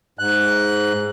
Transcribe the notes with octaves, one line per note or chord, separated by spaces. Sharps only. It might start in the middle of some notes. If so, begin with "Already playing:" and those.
G#2 F#6